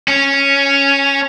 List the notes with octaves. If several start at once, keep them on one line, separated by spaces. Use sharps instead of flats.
C#4